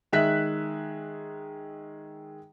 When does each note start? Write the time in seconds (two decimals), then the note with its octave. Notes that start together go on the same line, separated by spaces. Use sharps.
0.12 D#3 G#3 E5 F#6 B6